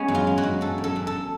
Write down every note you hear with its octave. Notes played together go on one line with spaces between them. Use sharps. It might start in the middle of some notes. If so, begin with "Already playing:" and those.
Already playing: G#3 B3 C#4
F#2
F4
G#3
F#4
F#2
F#2 A4
F#2
A4
F#2
A4